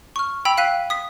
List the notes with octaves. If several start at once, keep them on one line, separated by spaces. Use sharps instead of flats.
C#6 F6
G5 B5 E6 B6 F7
F5 F#6 B6 D#7
D#6 B6